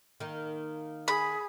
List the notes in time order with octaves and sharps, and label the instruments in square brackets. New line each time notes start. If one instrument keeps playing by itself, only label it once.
[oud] D#3 A#3
[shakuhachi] G#4 [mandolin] B5